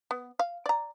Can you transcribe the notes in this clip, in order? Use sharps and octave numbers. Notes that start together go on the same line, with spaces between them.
B3
F5
D5 A#5